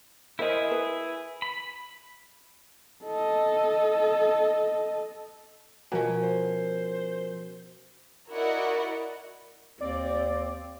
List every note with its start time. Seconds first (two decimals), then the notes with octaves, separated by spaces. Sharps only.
0.39 E4 G#4 A#4 C5 D#5
0.71 B4
1.42 B5
3.04 A4 D#5
5.92 B2 F3 C#4 A#4 G#5
6.23 C5
8.30 E4 F#4 A#4 D5 D#5 F#5
9.81 D#2 C4 D5